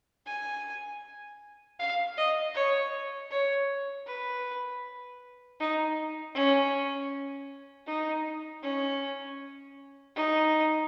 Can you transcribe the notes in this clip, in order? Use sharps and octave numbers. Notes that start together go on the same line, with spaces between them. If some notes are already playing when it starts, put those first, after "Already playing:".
G#5
F5
D#5
C#5
C#5
B4
D#4
C#4
D#4
C#4
D#4